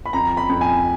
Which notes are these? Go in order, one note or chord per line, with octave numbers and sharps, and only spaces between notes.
B5
F2 A#5
B5
F2
G#5